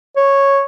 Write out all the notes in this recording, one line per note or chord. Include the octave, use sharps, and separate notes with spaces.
C#5